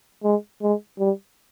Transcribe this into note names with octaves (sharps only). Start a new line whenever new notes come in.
G#3
G#3
G3